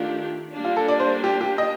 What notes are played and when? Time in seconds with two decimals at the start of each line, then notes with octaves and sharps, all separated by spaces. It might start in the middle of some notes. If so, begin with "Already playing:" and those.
Already playing: D#3 A3 D4 F4 G4
0.53 G3 A#3 D4
0.65 F4
0.77 A4
0.88 D5
1.00 C5
1.24 G4
1.41 G4
1.58 D#5